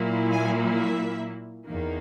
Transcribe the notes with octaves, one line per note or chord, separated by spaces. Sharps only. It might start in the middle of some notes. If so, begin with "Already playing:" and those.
Already playing: A#2 F#3 A#3 E4
G#5
E5
E2 D#3 A#3